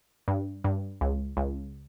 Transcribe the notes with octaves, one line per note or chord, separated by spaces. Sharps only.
G2
G2
C#2
C#2